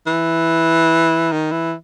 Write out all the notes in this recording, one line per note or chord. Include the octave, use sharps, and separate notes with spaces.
E3
D#3
E3